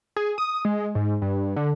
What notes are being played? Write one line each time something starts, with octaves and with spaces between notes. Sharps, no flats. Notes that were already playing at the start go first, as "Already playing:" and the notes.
G#4
D#6
G#3
G#2
G2
D3